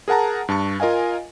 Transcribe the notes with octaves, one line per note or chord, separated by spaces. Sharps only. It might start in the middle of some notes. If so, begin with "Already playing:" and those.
G#4 A#4 F#5 A5 A#5
G2 A5 C#6
F4 A#4 D#5 F5 G#5